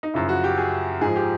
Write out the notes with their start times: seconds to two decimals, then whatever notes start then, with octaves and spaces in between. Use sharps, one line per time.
0.03 D#4
0.14 F#2 C#3 F3 E4
0.29 F#4
0.44 G4
0.58 G#4
1.01 G#2 F3 G#4
1.16 G4